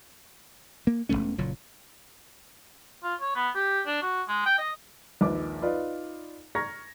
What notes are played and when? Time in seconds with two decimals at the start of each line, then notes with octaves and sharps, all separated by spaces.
0.87 A#3
1.09 E1 F2 A3 C#4
1.38 F#1 A#2 F#3
3.03 F4
3.21 C#5
3.35 B3
3.55 G4
3.87 D4
4.02 F#4
4.28 G#3
4.46 G5
4.58 D#5
5.21 A#1 D#2 G#3 B4 D6
5.62 D#4 F4 B4 D5
6.55 A#5 C#6 F6 G#6 A#6